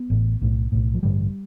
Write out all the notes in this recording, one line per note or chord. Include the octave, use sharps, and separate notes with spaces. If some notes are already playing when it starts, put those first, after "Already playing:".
Already playing: B3
A1 A2
B1 A2
B1 A2
F3
A1 G2 D3 G3